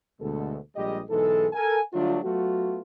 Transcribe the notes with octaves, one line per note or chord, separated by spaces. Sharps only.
D2 B2 G#3 A4
A#1 G3 G#3 G4 D#5
B1 G#2 E3 G#3 A4
A4 A#4 G#5
D3 F#3 G3 A3 D4 F4
F#3 A3 B3 F4 F#4